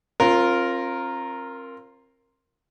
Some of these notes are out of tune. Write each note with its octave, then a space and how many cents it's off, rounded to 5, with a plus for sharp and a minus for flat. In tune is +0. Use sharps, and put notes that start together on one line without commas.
C4 +40 F4 +0 A#4 +0